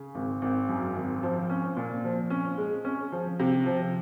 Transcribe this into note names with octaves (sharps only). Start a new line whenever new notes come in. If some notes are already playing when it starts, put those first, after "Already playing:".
Already playing: C#3
G#1
G#1
F#2
G#1
F3
C#4
A#2
F3
C#4
G#3
C#4
F3
C3
F3